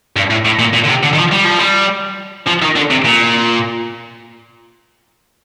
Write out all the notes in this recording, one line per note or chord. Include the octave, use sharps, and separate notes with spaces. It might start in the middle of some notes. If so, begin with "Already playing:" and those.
G2
A2
A2
A#2
A#2
D3
C3
D3
D#3
F3
G3
F3
G3
F3
D#3
D3
C3
A#2